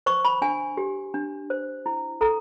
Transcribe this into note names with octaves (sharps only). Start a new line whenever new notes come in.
C5 C#6
B5
D4 G#5
G4
D4
C5
E4
A4 A#5